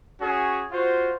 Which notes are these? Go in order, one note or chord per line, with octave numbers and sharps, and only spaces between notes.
C#4 F#4 G#4
F4 F#4 C5